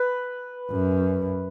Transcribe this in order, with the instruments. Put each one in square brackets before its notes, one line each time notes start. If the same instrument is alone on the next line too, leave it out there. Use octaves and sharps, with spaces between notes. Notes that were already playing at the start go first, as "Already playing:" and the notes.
Already playing: [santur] B4
[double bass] F#2